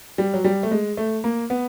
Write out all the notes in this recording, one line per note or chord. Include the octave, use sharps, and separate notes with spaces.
G3
F#3
G3
A3
G#3
A3
A#3
B3